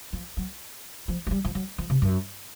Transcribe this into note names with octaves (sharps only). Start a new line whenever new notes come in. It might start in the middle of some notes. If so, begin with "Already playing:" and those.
F3
F#3
F3
G#3
G3
F3
F#3
F3
C3
F#2